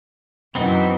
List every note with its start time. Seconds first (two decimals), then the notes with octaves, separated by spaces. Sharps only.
0.55 F#2 E3 B3 C4 D#4